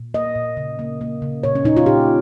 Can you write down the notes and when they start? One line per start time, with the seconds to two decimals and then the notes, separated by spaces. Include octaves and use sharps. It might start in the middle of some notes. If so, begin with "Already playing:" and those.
Already playing: A#2
0.14 A#3 D#5
0.35 A#2
0.57 C#3
0.79 A#3
1.01 A#3
1.22 C#3
1.43 A#2 C#5
1.55 C#4
1.64 A#2 D#4
1.77 F4
1.86 A#2 G4